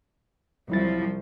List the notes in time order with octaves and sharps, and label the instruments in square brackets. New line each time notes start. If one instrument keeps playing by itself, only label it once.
[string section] C2 F3 [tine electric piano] F#3 E4 A6